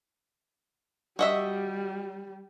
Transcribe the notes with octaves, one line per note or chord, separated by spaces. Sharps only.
G3 F#4 D#5 E5